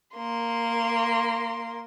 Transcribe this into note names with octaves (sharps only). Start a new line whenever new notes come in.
A#3 C6